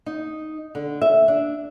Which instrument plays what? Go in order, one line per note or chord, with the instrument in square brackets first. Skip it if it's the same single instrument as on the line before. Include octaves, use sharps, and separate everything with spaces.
[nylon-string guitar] D#4
D3
E5
D4